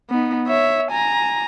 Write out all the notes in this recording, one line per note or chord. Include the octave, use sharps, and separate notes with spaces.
B3 D#4
C#5 E5
G#5 A#5